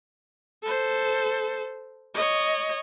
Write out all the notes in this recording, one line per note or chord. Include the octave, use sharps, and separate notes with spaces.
A4 C5
C#5 D#5